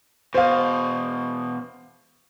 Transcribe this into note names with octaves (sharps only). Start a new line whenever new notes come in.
E2 B2 C5 F5